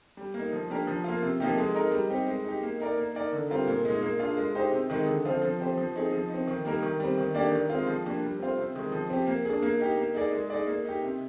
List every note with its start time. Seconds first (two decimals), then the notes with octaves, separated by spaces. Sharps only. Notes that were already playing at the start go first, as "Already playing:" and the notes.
0.17 G3
0.34 A#3
0.39 D#4
0.52 F3
0.70 A#3 D4 G4 A#4
0.87 F3
1.04 A#3 F4
1.22 C3
1.40 F3 A#3 D#4 G4
1.58 G#3
1.75 D#4 A#4 D#5
1.92 G3
2.10 C4 D#4 G4
2.27 G#3
2.45 D#4 G4
2.63 A#3
2.80 D#4 A#4 D5
2.97 A#3
3.15 D#4 A#4 D5
3.33 D3
3.50 G3 C4 F4 A#4
3.67 A#2
3.85 G#3 D#4
4.02 A#3
4.19 D4 F4 G#4
4.37 G#3
4.55 D#4 G4 C5 D#5
4.72 C3
4.90 D#3 G#3 D#4
5.07 D3
5.25 F3 C4 F4 C5
5.42 F3
5.60 C4 G4 C5
5.77 F3
5.95 C4 D#4 G#4
6.12 F3
6.29 C4 D#4
6.47 D#3
6.65 G3 A#3 D#4 A#4
6.83 D#3
7.00 G3 C4
7.17 D#3
7.34 A#3 D4 G4 D5
7.52 D#3
7.70 G#3 C4 F4
7.87 F3
8.04 A#3 D4 G4
8.22 G3
8.40 C4 F4 C5
8.58 C3
8.75 D#3 G#3
8.92 F3
9.10 C4 G4
9.27 A#3
9.45 D4 G#4
9.62 A#3
9.80 D#4 G4
9.97 A#3
10.15 D#4 G#4 D5
10.33 G#3
10.50 D#4 G#4 D5
10.67 A#3
10.85 D#4 G4
11.02 C3